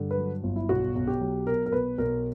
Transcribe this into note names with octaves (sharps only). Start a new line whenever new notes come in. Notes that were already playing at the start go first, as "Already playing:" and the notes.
Already playing: G2 D3
B4
F#3
G1
E4
B1 F#4
B1
G4
F#3
B2 A#4
A#4
B1 B4
B1 A#4